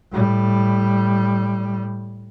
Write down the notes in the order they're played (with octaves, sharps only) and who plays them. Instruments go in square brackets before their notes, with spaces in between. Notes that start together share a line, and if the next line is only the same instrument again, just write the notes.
[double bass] A2 G3